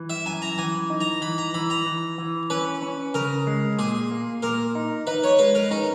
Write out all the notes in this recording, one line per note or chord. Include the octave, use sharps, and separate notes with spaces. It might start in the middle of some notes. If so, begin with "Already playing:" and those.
Already playing: E3
E5
F#2 G#5
A#5
E3 G#5
D#4
A#5
E3 B5
A#5
E3 B5
A#5
E3
E3
C#4 B4
C#4
C#3 A#4
G#3
A#2 G#4
A#3
A#2 A#4
D#4
D#4 B4
C#5
G#3 B4
A#4
C#4 D#4